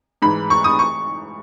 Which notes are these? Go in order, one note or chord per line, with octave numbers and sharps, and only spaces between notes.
G#2 E3 B5
C#6
D#6
C#6